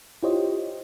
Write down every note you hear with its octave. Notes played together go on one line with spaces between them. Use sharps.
E4 F4 G4 C5 C#5 D#5